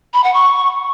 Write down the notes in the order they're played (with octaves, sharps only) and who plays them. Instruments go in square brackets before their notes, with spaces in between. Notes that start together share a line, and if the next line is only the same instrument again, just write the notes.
[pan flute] B5
F#5
C#6